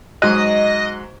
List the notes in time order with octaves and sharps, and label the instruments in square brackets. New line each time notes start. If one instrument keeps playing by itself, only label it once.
[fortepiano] G#2 F#3 F#6 [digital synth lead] D#5